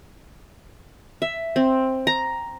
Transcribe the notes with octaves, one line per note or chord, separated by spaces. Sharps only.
E5
C4
A#5